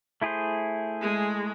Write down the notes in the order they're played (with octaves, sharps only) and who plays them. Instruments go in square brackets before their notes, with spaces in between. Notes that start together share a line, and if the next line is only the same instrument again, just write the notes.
[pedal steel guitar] A3 E4 G#4 C5
[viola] G#3